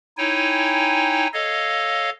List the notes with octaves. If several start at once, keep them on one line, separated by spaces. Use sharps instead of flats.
D#4 E4 C#5 G5 G#5
A4 C#5 D#5 F5